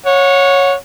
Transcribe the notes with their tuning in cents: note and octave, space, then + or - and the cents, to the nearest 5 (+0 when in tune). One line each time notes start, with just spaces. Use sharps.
C#5 +0 F#5 -30